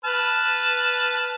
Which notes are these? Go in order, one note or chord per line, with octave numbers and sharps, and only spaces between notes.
B4 A5 F6